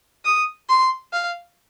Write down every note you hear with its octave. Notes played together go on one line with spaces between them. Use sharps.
D#6
C6
F5